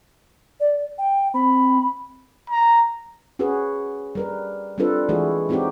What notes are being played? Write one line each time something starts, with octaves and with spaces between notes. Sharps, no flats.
D5
G5
C4 B5
A#5
C#4 F#4 G#4 B4
G3 A#4 B4
G3 C4 D4 F4 A4 B4
E3 G#3 A3 E4 F#4 G#4
G#3 C4 D#4 E4 F#4 G4